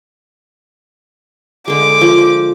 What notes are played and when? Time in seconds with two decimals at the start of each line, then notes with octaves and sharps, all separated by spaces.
1.68 D3 G#3 D6
2.01 F3